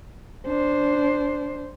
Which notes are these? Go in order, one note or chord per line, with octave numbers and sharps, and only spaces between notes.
D4 C5